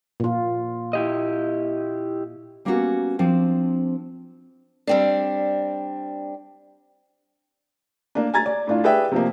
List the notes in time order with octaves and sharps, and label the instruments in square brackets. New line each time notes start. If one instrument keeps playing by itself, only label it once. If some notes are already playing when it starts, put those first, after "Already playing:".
[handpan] A#2 F4
[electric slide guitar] E4 G4 D#5
[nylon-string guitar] G3 A#3 B3 C#4 D4 F#4
F3 C4 D4
[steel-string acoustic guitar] G3 C4 D4
[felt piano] A#3 D4
G#5 A#5 G#6 A6
D5
A2 D4 F4
G4 G#4 B4 D5 E5 G5
C3 F3 A#3